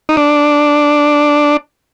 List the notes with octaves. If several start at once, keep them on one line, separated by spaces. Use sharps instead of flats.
D#4
D4